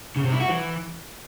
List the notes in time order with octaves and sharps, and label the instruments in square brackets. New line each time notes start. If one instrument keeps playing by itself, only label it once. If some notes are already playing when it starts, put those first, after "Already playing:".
[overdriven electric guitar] C#3
C3
E4
F#4
E3